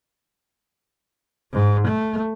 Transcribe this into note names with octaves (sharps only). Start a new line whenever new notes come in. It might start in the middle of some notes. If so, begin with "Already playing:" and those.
G#2
A3